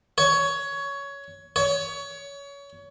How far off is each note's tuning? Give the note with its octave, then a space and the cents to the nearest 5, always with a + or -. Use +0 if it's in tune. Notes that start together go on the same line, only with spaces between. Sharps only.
C#5 +15
C#5 +25